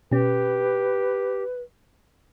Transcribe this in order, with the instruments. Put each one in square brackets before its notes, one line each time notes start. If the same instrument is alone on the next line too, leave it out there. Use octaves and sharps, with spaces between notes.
[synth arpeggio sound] B2 C#4 [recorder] G4 [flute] B4